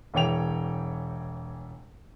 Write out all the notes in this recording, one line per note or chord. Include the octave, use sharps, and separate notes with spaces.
E1 E3 C#5 G5 F7